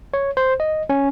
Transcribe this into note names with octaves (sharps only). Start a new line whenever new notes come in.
C#5
C5
D#5
C#4